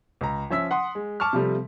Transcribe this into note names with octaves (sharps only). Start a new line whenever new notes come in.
C#2 A#5
F3 C#4 E5 E6 B6
F#5 C6 D#6
G#3
A5 C#6 D6 F6
C3 F3 G3 A3